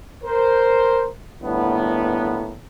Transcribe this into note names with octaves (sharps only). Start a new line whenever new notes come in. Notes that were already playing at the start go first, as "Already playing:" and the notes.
A#4 C5
G1 A2 A#3 B3